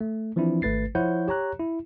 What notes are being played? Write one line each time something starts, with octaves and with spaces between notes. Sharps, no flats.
A3
E3 F3 C4 D4 E4
G#1 A3 B4 A6 C7
F3 E4 C5 C#5 F#5 G6
G4 C#5 A#5 F#6
E4